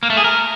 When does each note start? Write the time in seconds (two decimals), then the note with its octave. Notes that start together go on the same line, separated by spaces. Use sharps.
0.03 A#3
0.10 A3
0.17 G#4
0.24 A#4